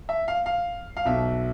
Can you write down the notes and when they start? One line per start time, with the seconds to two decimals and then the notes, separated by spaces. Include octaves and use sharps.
0.09 E5
0.28 F5
0.46 F5
0.97 F5
1.05 B1 B2 E5